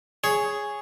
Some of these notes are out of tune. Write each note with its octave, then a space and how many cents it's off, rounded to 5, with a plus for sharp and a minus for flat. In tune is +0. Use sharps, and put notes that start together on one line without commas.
G#4 +0 C#5 +0